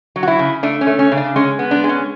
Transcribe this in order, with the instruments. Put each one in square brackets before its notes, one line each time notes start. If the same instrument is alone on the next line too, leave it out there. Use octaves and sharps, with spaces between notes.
[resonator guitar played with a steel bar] F#3
F#4
E4
C#3
A3 D4
C#4
A3
C#4
C#3
D4
G#3 C#4
B3
D4
G#3
C#4